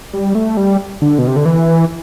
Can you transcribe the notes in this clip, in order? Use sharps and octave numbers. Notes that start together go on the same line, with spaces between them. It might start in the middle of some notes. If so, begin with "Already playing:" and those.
G3
A3
G3
D3
B2
C3
D3
E3